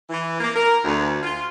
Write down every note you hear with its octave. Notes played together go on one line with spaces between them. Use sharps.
E3
A#3
A#4
D2
F4